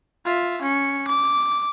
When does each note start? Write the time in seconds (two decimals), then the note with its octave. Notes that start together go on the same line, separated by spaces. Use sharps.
0.25 F4 E5
0.62 C#4 C#7
1.08 D6